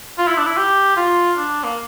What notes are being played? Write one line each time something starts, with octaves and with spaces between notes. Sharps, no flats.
F4
E4
D4
E4
G4
F4
D4
A#3